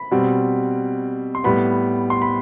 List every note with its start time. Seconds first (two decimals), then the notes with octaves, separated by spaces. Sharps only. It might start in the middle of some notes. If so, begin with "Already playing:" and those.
Already playing: B5
0.11 B2 G3 C4
1.35 C6
1.44 A2 G3 B3 B5
2.10 C6
2.22 B5